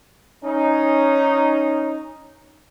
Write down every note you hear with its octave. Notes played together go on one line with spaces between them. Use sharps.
C#4 D#4